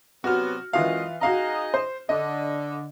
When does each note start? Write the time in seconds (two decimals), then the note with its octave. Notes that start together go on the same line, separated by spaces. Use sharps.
0.24 C3 F#3 B3 F#4 F6
0.73 F#2 E3 G#3 F4 D#5 F5
1.21 D#4 F#4 G#4 D#5 F5 A#5
1.74 C5
2.09 D3 D#5